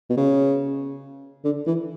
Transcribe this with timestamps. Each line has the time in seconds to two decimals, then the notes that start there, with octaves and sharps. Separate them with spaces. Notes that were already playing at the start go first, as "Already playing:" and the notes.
0.10 B2
0.17 C#3
1.44 D3
1.66 E3